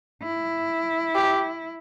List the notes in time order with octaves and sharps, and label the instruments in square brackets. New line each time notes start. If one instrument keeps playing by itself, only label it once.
[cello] E4
[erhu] G4